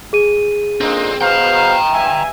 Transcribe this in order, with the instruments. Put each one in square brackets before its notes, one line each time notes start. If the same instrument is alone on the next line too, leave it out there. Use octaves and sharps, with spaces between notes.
[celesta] G#4 D#7
[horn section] A#2 D3 D#4 [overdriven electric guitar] C4
[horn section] B2 C5 F5 [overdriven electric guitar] G5 A#5
[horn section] G2 E5 G#5